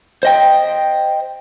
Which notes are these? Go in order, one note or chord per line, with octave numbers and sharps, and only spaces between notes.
C5 D#5 G5